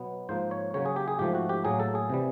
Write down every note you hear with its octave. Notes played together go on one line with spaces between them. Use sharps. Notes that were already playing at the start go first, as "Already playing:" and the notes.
Already playing: B2 F#3 B3
G#2 F3 A#3 C5
C#5
C#3 F#3 A#3 C#5
G#4
G4
G#4
G#2 F3 A3 G4
F#4
G4
A2 F#3 A#3 G#4
A4
G#4
C3 E3 G3